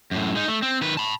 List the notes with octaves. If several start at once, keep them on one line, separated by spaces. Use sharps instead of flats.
F#2 A2
G#3 D#4
A3
C4
D#3 B4
A5 B5